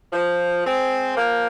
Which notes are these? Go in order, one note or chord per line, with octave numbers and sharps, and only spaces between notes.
F3
G#3 C4
F3 A#3